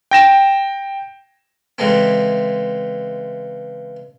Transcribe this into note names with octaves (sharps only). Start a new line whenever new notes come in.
G5 A#6 E7
C#3 E3 G#3 A3 C4